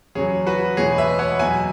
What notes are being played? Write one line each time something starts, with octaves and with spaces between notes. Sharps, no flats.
E2 C#3 F#3 G#4 C#5
F#4 B4
E2 B2 G#3 G#4 C#5
B4 E5
C#5 F#5
E2 B2 F#3 E5 G#5